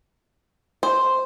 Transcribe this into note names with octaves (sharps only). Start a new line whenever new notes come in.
C5